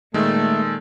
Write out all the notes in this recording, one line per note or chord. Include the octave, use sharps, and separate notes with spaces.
A#2 D#3 G#3 A3 A4